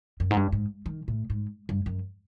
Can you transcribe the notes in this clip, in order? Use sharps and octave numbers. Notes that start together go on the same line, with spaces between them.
F#2
G#2
G2
G#2
D#3
A2
G#2
G2
F#2